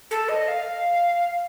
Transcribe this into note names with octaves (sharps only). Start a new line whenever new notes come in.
A4
D#5
F5